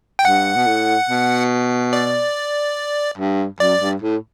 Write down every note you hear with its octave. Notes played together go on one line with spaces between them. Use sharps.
G5
G2 F#5
B2
A2
B2
D5
G2
F#2 D5
G2
A2